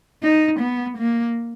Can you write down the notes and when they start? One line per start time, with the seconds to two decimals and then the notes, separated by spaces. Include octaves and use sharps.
0.23 D#4
0.60 B3
0.98 A#3